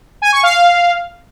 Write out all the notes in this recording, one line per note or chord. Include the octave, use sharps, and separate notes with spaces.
G#5
C#6
F5